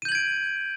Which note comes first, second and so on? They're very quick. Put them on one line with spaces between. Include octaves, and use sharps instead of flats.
D#7 G6 F#7 G#6 D7